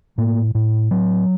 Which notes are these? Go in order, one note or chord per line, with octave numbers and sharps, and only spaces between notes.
A2 A#3
A2
A2 F#3